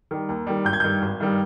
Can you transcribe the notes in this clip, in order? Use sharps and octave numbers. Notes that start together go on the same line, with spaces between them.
D#3 G3
D#2
D#3 G3
G#1 G6
G#6
G2 D#3 G3 G6
G#1
G2 D#3 G3